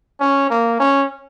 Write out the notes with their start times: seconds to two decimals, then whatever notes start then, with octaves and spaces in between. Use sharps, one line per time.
0.20 C#4
0.50 A#3
0.80 C#4